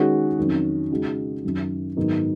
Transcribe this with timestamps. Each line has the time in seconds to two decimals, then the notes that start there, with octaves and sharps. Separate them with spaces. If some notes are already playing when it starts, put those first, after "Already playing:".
Already playing: D#3 G#3 C#4 F#4
0.38 F2 D#3 F#3 C#4
0.91 C#3 G#3 D#4 F#4
1.44 F#2 D#3 F#3
1.97 G#2 D#3 F#3 B3 D#4